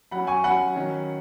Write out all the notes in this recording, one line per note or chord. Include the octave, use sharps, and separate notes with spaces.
F#3 C#4 F#5 B5
G#5 C#6
F#3 C#4 F#5 B5
D#3 F#3 C#4